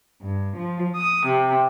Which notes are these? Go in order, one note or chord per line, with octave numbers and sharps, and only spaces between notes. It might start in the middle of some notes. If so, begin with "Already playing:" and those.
G2
F3
D#6
C3